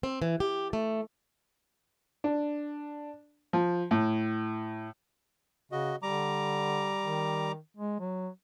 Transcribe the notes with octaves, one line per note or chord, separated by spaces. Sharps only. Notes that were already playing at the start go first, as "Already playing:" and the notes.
C4
E3
G4
A3
D4
F3
A2
C#3 F#4 D#5
D3 G3 A#5 D6
D#3
G#3
F#3